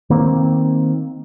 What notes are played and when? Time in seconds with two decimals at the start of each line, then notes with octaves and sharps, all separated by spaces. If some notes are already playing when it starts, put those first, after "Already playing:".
0.10 D#3 A#3 C4